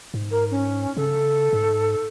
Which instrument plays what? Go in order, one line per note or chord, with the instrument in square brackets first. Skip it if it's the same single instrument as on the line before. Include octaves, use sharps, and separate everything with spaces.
[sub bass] G#2
[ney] A#4
C#4
[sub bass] C#3 [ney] A4
[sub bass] G#2